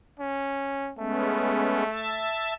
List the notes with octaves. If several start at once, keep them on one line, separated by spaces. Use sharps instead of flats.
C#4
G#3 A3 B3 C#4
E5 A5